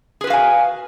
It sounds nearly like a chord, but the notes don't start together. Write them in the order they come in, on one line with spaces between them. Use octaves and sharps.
G#4 B4 F#4 F5 G#5